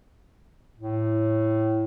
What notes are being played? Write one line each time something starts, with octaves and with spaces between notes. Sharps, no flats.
A2